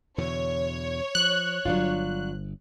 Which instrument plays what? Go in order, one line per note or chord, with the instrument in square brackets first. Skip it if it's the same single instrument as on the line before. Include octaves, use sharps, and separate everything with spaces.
[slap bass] E2 B2 D3 [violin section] C#5
[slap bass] F3 [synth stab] F#6
[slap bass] G1 [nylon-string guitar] F#3 D4 F4